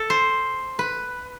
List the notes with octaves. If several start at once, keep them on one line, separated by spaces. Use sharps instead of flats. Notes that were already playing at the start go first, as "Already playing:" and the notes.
Already playing: A4
C5
B4